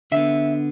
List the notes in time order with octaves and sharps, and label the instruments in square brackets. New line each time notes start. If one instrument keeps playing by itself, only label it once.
[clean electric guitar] D3 B3 E5